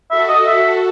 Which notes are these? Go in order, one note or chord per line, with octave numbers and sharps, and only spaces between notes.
F#4 A4 E5
D#5
E5